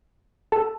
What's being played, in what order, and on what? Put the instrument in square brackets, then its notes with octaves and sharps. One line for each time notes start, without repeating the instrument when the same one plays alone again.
[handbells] A4 A5